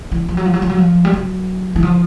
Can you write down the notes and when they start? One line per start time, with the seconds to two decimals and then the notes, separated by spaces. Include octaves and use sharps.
0.12 E3
0.29 F3
0.37 F#3
0.45 F3
0.54 F#3
0.62 F3
0.70 F#3
0.78 F3
1.05 G3
1.14 F#3
1.76 E3
1.83 F3